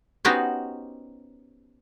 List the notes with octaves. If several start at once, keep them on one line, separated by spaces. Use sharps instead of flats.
B3 C#4 D#4 F#4 G4 C5